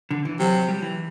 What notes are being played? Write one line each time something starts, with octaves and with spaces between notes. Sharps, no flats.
D3
E3
C3 F#3
G3
E3